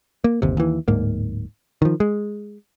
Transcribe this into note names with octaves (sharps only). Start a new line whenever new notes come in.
A#3
G1 D#2 C3
D#2 E3
D1 G#2 A#3
D#3 F3
G#3